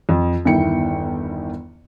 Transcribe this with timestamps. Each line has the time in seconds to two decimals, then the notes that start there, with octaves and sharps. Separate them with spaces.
0.09 F2
0.45 G1 E2 D#3 E4 G5 C#7